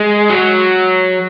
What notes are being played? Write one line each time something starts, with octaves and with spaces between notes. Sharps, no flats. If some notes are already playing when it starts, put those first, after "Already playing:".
Already playing: G#3
F#3